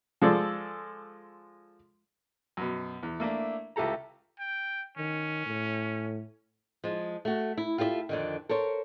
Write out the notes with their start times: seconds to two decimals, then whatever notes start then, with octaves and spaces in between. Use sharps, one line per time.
0.22 F3 G#3 A4 D5
2.57 F#2 B2
3.03 E2
3.20 A3 A#3 D4 E4
3.76 C#2 E4 G4 A4 A#5
4.39 G5
4.98 D#3 C#4
5.46 A2
6.84 F3 G#3
7.25 A3 F#4
7.58 E4
7.78 F4 G4 A4 D5 E5
8.09 F2 D3 D#3
8.49 A4 A#4 C5 C#5